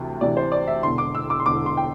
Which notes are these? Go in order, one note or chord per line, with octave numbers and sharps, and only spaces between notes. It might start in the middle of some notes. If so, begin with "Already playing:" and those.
Already playing: D2 C3 E3
D2 C3 E3 D5
C5
D5
E5
E1 E2 D3 C6
D6
E6
D6
C6
E1 E2 D3 D6
C6
G5